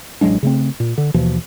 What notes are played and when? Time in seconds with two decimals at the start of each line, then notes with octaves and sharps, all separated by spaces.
0.21 A1 F#3 G#3 D4
0.43 C#3 A3 C4
0.80 A#2
0.98 D3
1.14 D#2 B2 E3 F3